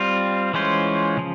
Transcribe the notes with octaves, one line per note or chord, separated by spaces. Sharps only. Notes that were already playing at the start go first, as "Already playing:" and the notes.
Already playing: G3 C4 F4
E3 G#3 C#4 F4 C5
C#3 F3